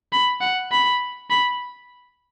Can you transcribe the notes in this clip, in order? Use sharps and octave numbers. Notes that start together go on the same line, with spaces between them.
B5
F#5
B5
B5